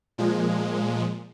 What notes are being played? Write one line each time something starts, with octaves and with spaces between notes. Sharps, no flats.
A#2 F3 G#3